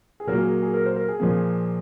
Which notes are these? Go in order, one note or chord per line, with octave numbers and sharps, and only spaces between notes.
G#4
A#2 F#3 A#3 A#4
G#4
G#4
A#4
C5
A#4
G#4
A#2 F3 A#3